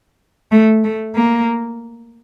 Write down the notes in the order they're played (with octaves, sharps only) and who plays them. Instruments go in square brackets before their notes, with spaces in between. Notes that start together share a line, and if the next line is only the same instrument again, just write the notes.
[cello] A3
A3
A#3